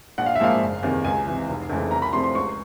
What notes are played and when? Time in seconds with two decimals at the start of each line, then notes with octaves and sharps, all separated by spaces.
0.18 A#1 F#5
0.26 F5
0.36 E5
0.39 G#2 F3 A#3 F5
0.61 F#1
0.83 E2 C3 D#3
1.05 C#2 G#5
1.26 C3 E3
1.48 F1
1.70 F2 C#3 E3 A3
1.91 C2 A#5
2.02 B5
2.13 C3 F3 A3 C4 C6
2.24 C6
2.35 C#2 C#6